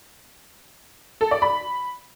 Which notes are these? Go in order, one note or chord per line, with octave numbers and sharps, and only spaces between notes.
A4
D5
B5